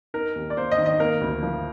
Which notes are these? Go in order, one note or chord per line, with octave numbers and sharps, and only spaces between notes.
D#4 A#4
D#2
D5
A#3 C5
D#5
D#3
D#5
A#3 A#4
D2
F3